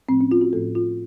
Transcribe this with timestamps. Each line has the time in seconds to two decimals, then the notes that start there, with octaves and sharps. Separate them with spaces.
0.09 A2 F3 A3 C4
0.21 C#4
0.31 F4
0.41 F#4
0.52 A2 F3 A3 A4
0.75 F4